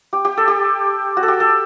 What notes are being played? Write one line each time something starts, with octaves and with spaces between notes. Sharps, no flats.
G4
G4
A4
G4
F#4
A4
G4
A4